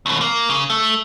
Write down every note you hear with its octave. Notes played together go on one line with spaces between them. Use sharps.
D#2 B2
A#3
C#3
A3